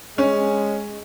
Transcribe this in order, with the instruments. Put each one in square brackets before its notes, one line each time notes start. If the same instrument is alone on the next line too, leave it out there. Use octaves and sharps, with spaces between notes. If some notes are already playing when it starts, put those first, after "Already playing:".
[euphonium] G#3 [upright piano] C#4